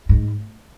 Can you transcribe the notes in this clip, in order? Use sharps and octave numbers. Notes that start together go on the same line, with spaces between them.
G#2